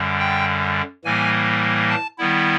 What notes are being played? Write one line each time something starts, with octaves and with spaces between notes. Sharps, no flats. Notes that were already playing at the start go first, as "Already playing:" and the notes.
Already playing: F#2 D3 G3
G5
A2 E3 G3 A#3 G#5
A5
D#3 G3 B3 E4